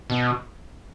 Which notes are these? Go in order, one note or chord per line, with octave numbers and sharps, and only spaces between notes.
B2